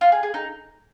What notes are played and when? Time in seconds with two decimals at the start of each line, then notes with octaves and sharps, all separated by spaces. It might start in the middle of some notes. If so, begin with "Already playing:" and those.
0.01 F4
0.12 G#4
0.23 G#4
0.34 D#4